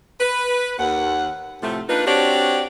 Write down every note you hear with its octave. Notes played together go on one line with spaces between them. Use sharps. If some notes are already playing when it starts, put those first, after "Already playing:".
B4
D#2 F#5
A2 C3 F3 A3
A#3 D4 D#4 F4 B4
C4 D4 F#4 G4 C#5 D5